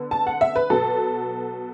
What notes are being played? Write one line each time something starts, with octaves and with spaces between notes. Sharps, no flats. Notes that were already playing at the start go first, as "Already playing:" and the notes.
Already playing: D3 B3
A5
F#5
E5
B4
B2 F#3 B3 A4